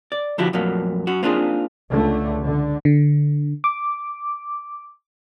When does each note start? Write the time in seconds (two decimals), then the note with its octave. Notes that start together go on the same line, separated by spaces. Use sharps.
0.12 D5
0.38 D3 F3 E4 F#4 G4
0.53 F2 A#2 F#3 A3 A#3
1.07 F#2 F#4
1.23 A#3 C4 D4 D#4 F4 G#4
1.90 C#2 D3 A3
2.42 D3
2.85 D3
3.64 D6